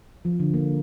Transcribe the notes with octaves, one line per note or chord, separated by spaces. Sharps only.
F3
D3
A#3